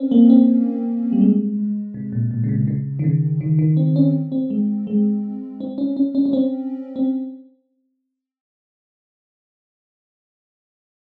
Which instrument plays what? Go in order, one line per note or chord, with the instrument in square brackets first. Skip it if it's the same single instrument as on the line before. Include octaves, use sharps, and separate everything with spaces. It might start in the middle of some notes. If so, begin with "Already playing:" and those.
Already playing: [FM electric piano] C4 C#4
A#3
C4
G3
G#3
C3
A#2
A#2
C#3
C3
C#3
D#3
C#3
D#3
D#3
C4
C#4
C4
G#3
G#3
C4
C#4
C#4
C#4
C#4
C4
C4